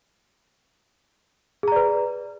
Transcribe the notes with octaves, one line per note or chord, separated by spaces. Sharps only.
G#4 B4 D5 A#5